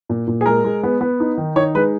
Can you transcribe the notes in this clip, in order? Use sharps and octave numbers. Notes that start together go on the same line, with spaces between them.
A#2
A#2
G#4
G#3 A#4
G#3
B3
B3
D#4
D#3
D#4 C#5
G#3 B4